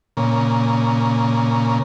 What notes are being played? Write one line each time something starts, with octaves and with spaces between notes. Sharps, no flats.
A#2 C#3